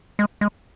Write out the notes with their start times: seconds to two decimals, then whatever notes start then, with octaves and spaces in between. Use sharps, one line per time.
0.19 G#3
0.41 G#3